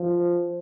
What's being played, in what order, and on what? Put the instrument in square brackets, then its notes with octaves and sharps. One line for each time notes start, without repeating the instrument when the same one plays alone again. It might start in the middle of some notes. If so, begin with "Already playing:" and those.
Already playing: [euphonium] F3